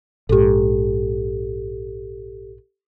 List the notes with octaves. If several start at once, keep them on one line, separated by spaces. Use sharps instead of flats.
A#1 G#2 G4 A4